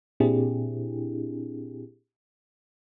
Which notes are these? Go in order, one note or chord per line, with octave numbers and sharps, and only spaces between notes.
A#2 C4 D4 E4 G4 G#4